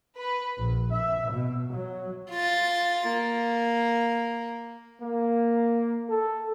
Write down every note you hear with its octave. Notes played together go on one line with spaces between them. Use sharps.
B4
A#1
E5
B2
F#3
F4 A6
A#3
A#3
A4